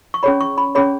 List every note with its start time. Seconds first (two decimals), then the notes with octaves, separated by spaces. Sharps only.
0.14 C#6
0.23 C#4 G#4 C#5 B5
0.41 C#6
0.58 B5
0.75 C#4 G#4 C#5 B5